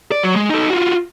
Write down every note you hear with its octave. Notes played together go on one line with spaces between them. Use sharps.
D5
F#3
G#3
D#4 A4
F4 F#4